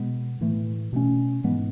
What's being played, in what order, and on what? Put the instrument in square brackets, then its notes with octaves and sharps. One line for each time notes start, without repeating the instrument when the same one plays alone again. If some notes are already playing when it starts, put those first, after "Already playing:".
Already playing: [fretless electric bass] B2 G#3 B3
A2 E3 A3
B2 A3 C#4
G#2 E3 G#3 B3